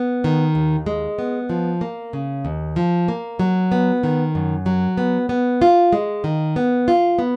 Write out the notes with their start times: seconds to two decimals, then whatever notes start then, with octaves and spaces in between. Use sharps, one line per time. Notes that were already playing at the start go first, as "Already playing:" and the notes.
Already playing: B3
0.24 D#3
0.55 D#2
0.86 G#3
1.19 B3
1.50 F3
1.81 A#3
2.13 C#3
2.45 D#2
2.76 F3
3.08 A#3
3.39 F#3
3.72 B3
4.03 D#3
4.35 F#2
4.66 F#3
4.98 B3
5.29 B3
5.62 F4
5.93 G#3
6.24 D#3
6.56 B3
6.88 F4
7.19 B3